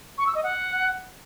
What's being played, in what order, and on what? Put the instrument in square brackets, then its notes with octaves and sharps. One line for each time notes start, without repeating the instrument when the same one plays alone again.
[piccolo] C#6
E6
D#5
F#5